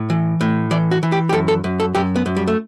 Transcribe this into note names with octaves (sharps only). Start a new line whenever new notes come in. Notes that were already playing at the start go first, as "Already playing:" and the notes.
Already playing: A2
E3
A2
E3 D5
F#4
E3
G4
G4
F#2 A4
A4
F#2
A4
F#2 G4
B3
F#2
G3
A3